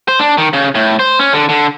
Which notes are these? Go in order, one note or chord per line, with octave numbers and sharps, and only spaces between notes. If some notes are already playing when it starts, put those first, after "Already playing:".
C5
D4
D#3
C#3
A2
C5
C#4
D3
D3